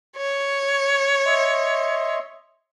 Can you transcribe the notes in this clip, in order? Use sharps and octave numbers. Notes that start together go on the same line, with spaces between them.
C#5
D#5 E5 C6